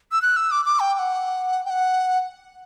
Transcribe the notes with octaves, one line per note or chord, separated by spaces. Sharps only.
E6
F#6
E6
D6
D6
G5
G5
F#5
G5
F#5